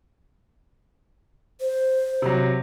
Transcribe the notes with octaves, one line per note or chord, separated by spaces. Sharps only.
C5
C3 F#3